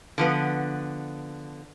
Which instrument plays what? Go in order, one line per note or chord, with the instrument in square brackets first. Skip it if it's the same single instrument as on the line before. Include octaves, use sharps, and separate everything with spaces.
[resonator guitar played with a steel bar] D3 F3 B3